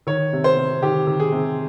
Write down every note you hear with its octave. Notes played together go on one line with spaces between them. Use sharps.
D#3 C#5
C3
C5
C3
D#3 G4
D#3
G#4
C3